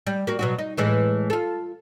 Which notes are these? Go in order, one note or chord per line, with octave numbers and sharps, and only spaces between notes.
G3
A#3 F#4
B2 F#3 F#4
D#4
A2 E3 G#3
F4 A4